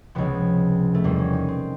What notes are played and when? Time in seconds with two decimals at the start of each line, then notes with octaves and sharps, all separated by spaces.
0.15 C#2 C3 F3 B3
0.94 A3
1.04 E2 B2 G3 A#3
1.19 C#4
1.33 D#4
1.48 C4